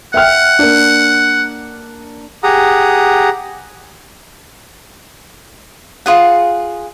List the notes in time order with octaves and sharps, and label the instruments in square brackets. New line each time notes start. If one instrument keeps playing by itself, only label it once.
[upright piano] E5 G5 F6 [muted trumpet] F#5
[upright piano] A#3 D4
[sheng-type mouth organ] G4 G#4 F#5 A#5 D#6
[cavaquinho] F4 G#4 F#5